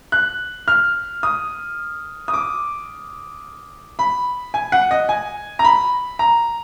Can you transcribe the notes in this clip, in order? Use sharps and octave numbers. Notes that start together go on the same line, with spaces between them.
F#6
F6
D#6
D#6
D6
B5
G#5
F#5
D#5
G#5
A#5
B5
A#5